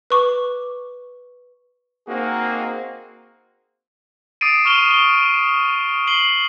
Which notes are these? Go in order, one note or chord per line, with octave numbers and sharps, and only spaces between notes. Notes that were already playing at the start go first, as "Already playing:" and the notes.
B4 C#6 D6
A#3 C4 D#4 F#4 G#4
D6 D#6 A6 C7 D7 D#7
C#6 F6 E7 F7 G7
G7
C7 F#7 G7